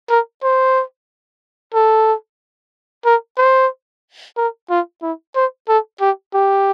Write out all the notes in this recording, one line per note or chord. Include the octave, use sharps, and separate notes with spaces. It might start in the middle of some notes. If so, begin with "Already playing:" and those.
A#4
C5
A4
A#4
C5
A#4
F4
E4
C5
A4
G4
G4